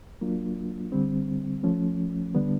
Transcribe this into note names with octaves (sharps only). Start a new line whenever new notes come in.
F#3 A#3 D4 F4
D3 G3 C4
F3 A3 C#4
D3 G3 B3 D4